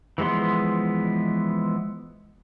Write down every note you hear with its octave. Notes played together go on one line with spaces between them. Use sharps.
E3 F3 G#3 B3 C6